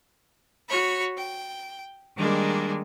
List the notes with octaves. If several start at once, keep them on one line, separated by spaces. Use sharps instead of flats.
F#4 C#5 B5
G5
D#3 G3 G#3 A#3 D4